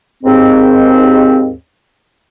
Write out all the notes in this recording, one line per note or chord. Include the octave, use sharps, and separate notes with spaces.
D#2 G#2 C4